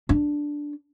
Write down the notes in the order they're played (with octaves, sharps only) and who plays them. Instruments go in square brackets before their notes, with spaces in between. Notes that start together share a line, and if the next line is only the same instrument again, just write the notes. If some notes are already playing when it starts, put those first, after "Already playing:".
[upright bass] D4